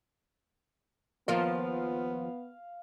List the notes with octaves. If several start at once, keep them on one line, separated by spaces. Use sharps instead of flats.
D#2 F3 B3 A#4 F5